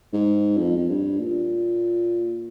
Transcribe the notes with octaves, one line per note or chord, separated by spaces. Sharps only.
G#2
F2
F2
G2
A#2